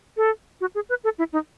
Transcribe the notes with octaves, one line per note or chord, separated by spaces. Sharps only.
A4
F#4
G#4
B4
A4
E4
D#4